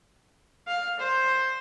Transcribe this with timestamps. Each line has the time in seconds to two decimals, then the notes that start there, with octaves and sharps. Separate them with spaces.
0.67 F5
0.99 C5